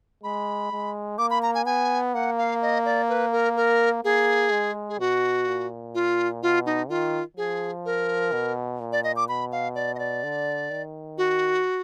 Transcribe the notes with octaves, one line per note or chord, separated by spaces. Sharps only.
G#3 B5
G#3
A#3 D6
B5
A#5
G#5
B3 G#5
A#3 F#5
F5
D#5
D5
B4
A#4
A#4
A#3 G#4
G#3
G#4
B2 F#4
A#2
F4
B2 F4
D#4
D#3 F4
F3 G#4
A#4
B2
A#2
D5
D#5
D6
B2 B5
F5
D5
D#5
D5
D3
D#3
F#4